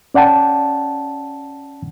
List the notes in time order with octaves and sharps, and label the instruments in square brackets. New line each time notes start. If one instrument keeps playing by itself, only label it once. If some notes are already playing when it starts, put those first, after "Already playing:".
[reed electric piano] C#4 D5 F#5 G5 A5